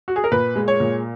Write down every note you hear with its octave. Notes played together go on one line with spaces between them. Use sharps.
F#4
G#4
A#4
A#2 B4
G#3
C#5
A#2